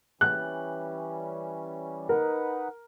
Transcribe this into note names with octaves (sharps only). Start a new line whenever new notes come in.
E3 G3 C#4 F#6
D#4 A#4 B4 F#5